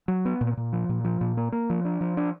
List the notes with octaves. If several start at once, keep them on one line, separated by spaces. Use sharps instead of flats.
F#3
B3
A#2
A#2
F3
A#2
F3
A#2
A#3
A#3
F3
D4
F3
D4